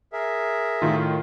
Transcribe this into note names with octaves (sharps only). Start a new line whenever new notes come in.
G#4 A#4 E5
A2 D#3 F4